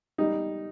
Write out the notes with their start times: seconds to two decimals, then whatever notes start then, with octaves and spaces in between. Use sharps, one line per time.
0.18 G3 D#4